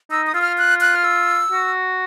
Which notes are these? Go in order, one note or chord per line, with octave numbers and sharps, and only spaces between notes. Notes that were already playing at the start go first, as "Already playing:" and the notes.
D#4 E6
D#6
F4 E6
F6
F#6
F#6
F6
E6
F#4